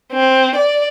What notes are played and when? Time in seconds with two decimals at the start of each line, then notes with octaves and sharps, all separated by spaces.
0.12 C4
0.55 D5